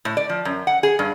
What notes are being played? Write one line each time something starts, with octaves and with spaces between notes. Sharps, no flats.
A2
D5
F3
F#2
F#5
G#4
G2